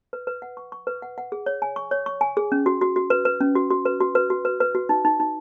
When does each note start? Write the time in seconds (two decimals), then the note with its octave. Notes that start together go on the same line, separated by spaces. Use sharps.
0.13 B4
0.27 B4
0.42 F#5
0.57 C#6
0.72 C#6
0.87 B4
1.02 F#5
1.18 F#5
1.32 G#4
1.46 C#5
1.62 G#5
1.76 C#6
1.91 C#5
2.06 C#6
2.21 G#5
2.37 G#4
2.52 C#4
2.66 F#4
2.81 F#4
2.96 F#4
3.10 B4
3.25 B4
3.41 C#4
3.56 F#4
3.70 F#4
3.85 B4
4.00 F#4
4.15 B4
4.30 F#4
4.45 B4
4.60 B4
4.75 F#4
4.89 D#4
5.05 D#4
5.20 D#4